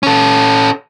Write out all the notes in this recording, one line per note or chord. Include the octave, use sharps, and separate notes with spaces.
C#4 A4